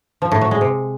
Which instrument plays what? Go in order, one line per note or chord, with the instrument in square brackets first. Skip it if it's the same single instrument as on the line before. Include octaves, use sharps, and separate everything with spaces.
[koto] F3
A2
F#3
G#3
C3